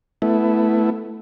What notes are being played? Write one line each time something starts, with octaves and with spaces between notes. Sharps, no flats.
A3 B3 E4